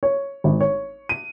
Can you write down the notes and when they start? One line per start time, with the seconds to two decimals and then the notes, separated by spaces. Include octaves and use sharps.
0.03 C#5
0.44 G#1
0.61 C#5
1.09 D#7